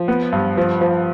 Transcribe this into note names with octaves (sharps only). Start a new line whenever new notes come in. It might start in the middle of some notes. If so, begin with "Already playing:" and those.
Already playing: F3
B3
G2
F3
F3